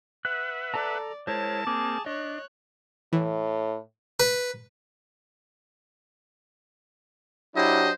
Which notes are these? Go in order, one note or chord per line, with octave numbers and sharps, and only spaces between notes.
B4 E5 F#5 F#6
A4 D5 A5 A#5
G#3 E4 A#4 C5 C#5 A5
A#3 C4 G#4 D6
D4 C#5 D#5 F#6
A2 E3
B4
F#3 D4 E4 G4 C5 D#5